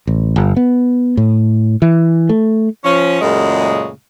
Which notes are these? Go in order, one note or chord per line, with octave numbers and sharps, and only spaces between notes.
A1
G1
B3
A2
E3
A3
F3 C#4
F#2 A#2 C#3 G#3 A3